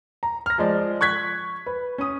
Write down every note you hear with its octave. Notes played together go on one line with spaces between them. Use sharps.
A#5
F6 A#6
F3 G#3 D5
C#6 F#6 G#6 B6
B4
C#4 D#6